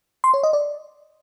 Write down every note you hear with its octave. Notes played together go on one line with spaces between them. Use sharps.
C6
C#5
D#5
D5